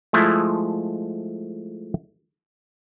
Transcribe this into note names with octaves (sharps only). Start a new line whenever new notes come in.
F3 G#3 A3 E4 F4